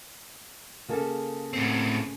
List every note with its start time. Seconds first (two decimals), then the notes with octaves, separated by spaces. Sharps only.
0.89 C#3 A#3 A4
1.53 A2 C4